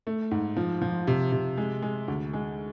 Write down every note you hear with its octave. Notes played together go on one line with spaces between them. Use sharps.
A3
G#2
F3
F3
C3
C3
G#3
G#3
D2
G#3